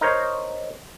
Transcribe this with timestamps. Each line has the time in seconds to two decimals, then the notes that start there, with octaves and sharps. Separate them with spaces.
0.01 D#4 A#4 C5 C#5